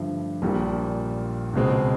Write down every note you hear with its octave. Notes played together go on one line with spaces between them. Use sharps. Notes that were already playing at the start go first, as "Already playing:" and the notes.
Already playing: G2 D3 F3 A3
A#1 A#2 G3
C#2 B2 G#3 C4